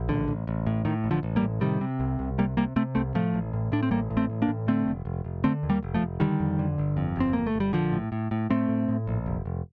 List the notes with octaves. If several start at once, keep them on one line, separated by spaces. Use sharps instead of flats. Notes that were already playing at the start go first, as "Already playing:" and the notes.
Already playing: A#1
A1 D3
A1
A1
A2
A2 D#3
A1
D3 F3
A1
G3 A#3
A2
C3 D#3 G3
C3
C2
C2
C3 G3 A#3
C3 G3 A#3
C3 A3 C4
C2 A3 C4
A2 F3 A3
A1
A2
A2 D4
C4
A1 G3 A#3
A2
A3 C4
A1
A#3 D4
A2
D3 A3 C4
F1
F1
F1
D3 A3 C4
D#2
G3 A#3
F1
F3 A3
F1
D3 D#3 G3
F2
D3
G1
F2
G1 C4
G1 A#3
A3
G1
G3
A#1 D3 F3
A2
A2
A2
A2 A3 C4
A2
A2
A#1
F1
F1